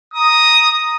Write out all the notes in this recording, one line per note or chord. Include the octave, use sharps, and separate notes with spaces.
A#5 D#6